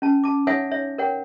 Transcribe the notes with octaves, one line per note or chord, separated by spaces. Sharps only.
C#4 A5
A5 D6
D#4 C#5 E5 F#5 G#5 D#6
C#5 E5
A#4 C#5 F#5 G5